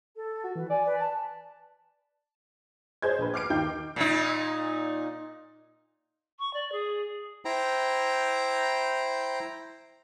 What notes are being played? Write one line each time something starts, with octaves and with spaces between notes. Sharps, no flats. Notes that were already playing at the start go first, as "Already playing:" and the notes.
A4
F#4
E3 B4
D5 G#5
B4
A5
G#4 C5 C#5 D#5 G6 G#6
A#1 B4
D6 F6 C7 D7
D#2 D#4 G5 G6
A#2 D#4
C#6
D5
G#4
E4 C5 G5 A#5